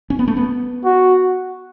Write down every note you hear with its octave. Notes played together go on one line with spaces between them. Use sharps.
C#4
B3
A3
B3
F#4